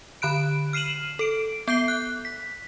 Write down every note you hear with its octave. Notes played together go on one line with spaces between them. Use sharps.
D3 B5 F#6 D7
F6 C7 D#7 E7 F#7
A4 D7
B3 G6 C7 G7
F#6
B6